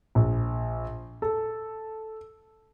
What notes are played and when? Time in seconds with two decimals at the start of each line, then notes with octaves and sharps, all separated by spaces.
0.15 A#1
1.22 A4